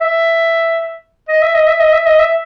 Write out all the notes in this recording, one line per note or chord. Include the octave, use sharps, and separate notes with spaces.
E5
D#5
E5
D#5
E5
D#5
E5
D#5
E5